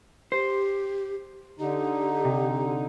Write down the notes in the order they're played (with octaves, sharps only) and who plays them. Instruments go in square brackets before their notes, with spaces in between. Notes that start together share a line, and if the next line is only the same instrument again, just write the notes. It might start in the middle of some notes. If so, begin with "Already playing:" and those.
[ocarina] G4 [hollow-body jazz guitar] C5
[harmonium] D3 D#4 [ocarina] G4
[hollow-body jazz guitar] C3